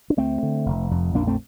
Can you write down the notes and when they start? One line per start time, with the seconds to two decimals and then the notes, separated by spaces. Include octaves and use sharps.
0.10 D4
0.17 D2 A3 C4
0.43 D3
0.66 F1
0.91 F2
1.14 A#1 A#3 D4
1.27 A3 C4